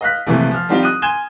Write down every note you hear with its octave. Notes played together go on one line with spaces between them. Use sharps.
D#5 F5 F#6 B6
A#1 C3 E3 F3 A3
F3 F6
F3 G3 C4 D#4 F4 G4
D#6 F#6 D#7
G#5 C6 G#6 D#7 E7 G7